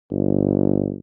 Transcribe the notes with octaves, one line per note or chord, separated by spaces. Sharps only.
G1